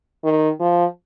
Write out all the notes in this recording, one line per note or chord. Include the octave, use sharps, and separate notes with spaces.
D#3
F3